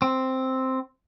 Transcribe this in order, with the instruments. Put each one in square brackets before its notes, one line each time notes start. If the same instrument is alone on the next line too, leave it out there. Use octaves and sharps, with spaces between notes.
[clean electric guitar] C4